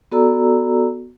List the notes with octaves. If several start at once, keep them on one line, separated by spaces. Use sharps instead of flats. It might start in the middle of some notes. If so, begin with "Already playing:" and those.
B3 F#4 A4 D5 A#5 E6